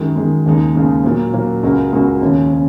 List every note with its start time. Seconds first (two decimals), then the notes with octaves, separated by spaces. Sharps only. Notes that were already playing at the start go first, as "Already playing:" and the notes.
Already playing: F#2 D#3 G#3
0.15 F#2 D#3 G#3
0.46 D#2 C#3 G#3 D#4
0.75 D#2 C#3 G#3 D#4
1.04 A#2 F#3 A#3
1.33 A#2 F#3 A#3
1.63 C#2 C#3 G#3 F#4 A#4
1.93 C#2 C#3 G#3 F#4 A#4
2.22 D#2 C#3 G#3 C#4
2.53 C#3